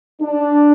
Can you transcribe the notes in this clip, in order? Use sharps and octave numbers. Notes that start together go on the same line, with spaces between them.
D4